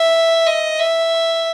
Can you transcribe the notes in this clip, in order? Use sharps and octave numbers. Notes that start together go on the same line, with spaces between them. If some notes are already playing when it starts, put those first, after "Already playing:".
Already playing: E5
D#5
E5